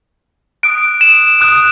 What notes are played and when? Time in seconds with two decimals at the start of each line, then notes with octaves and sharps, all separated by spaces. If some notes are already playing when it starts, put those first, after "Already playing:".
0.63 D#6 F#6 D7
1.01 E7
1.41 D#6 F#6